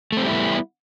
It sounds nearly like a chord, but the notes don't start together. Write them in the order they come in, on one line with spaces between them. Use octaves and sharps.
A3 C4 G3 E4 B3